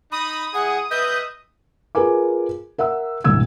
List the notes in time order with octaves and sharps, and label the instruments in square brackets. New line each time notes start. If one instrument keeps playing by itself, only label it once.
[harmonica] D#4 [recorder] B5 [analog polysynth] D#6
[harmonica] E4 G#4 [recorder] F#5
[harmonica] B4 D#5 E5 [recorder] G6
[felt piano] F4 G#4 A#4 B4 G#5 D6
A#4 E5 F#5 E6
E1 C2 A2 E6 G#6